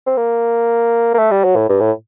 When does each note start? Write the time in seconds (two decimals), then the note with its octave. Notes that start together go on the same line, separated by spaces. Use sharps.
0.07 C4
0.18 A#3
1.14 A#3
1.19 A3
1.32 G3
1.45 F#3
1.56 A2
1.69 G2
1.81 A2